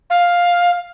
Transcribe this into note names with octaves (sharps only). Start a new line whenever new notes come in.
F5